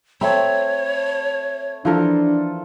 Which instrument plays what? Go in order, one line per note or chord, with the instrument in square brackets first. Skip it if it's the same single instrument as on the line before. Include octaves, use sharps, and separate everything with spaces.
[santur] A3 B5 [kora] C4 [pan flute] C#5
[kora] E3 F3 A#4 [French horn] D4 [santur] F4 A4